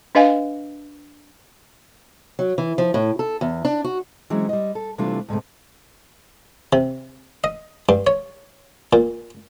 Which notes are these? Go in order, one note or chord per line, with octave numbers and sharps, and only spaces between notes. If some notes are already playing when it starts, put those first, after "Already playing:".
D4 B4 D#5 F5 G#5
F#3
E3
F3
A2
A4
E2
D4
F#4
E3 F#3 G#3 C4 C#4
G3 D#5
A4
C3 E3 G3 A3 D4 F4
D2 G#2 C3 A3
C3
D#5
G2
C#5
A#2